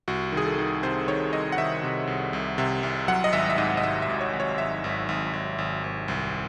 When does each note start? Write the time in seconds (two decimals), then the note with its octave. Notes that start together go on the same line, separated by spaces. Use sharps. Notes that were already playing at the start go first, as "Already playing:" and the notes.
0.08 C2 F#4
0.32 D#3 G#4
0.46 A4
0.58 D#3
0.83 C3 C5
1.08 D#3 C#5
1.33 C2 D#5
1.52 F#5
1.58 D#3 E5
1.83 C3
2.07 C2
2.33 C2
2.58 C3
2.83 C2
3.08 F#3 F#5
3.24 D#5
3.33 G#1 E5
3.50 E5
3.58 G#2 D#5
3.77 D#5
3.83 G#1 E5
4.02 E5
4.08 G#1
4.21 C#5
4.33 G#1
4.40 C#5
4.58 G#1 E5
4.84 G#1
5.09 G#1
5.33 G#1
5.58 G#1
5.84 G#1
6.08 C2